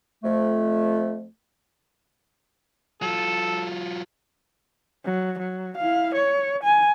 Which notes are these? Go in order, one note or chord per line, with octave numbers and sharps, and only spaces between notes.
F2 A3
F#3 F4 A4
F#3
F#3
E4 F5
C#5
G#5